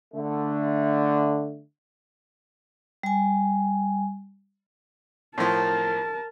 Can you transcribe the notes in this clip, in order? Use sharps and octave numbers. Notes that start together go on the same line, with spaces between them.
D3 A3
G3 G#5
A2 F3 A#4 A5